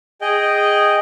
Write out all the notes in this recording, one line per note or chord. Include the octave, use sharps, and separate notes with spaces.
G#4 D#5 G5